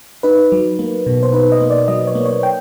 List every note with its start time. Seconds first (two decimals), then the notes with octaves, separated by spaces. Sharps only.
0.23 D#4 B4
0.52 F#3
0.79 A#3
1.07 B2
1.23 C5
1.33 D#4 B4
1.52 D#5
1.62 A#3
1.70 D5
1.88 F#3 D#5
2.07 C#5
2.15 A#3
2.26 C#5
2.43 G5